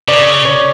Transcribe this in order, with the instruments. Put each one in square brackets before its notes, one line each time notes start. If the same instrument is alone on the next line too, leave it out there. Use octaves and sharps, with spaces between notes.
[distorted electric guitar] C#3 [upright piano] D5
[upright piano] C#5